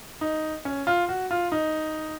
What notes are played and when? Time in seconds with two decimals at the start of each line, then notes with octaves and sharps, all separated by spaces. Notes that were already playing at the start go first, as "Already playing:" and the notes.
0.21 D#4
0.65 C#4
0.87 F4
1.09 F#4
1.31 F4
1.52 D#4